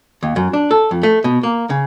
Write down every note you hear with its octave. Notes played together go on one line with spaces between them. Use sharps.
D#2
F#2
D4
A4
F2
A3
B2
A#3
C#3